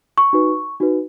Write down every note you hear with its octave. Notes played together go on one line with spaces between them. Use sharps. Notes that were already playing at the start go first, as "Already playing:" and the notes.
C#6
D#4 F#4 B4
D#4 F#4 B4